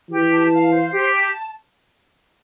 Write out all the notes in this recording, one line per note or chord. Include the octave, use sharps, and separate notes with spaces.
E3 G4
A5
F5
C5
G4
A5